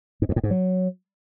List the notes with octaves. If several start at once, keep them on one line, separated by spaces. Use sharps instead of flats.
G#2
F2
A2
G#2
F#3